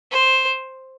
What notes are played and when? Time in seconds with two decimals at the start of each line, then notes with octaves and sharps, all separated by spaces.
0.11 C5